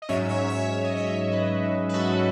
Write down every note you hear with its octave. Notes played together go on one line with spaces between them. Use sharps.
D#5
G#2 F#3 C#4 C#5 E5
C#5 E5
C#5 E5
E5
D#5
C#5 E5
B4 D#5
B4
F#4 A4